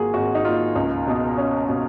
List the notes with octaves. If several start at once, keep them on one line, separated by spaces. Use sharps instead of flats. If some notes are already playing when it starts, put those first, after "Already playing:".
Already playing: G#1 A#3 F4 F#4 G#4
G#1 F#4
D#4
A#3 F4
C#2
B2
C#4
B2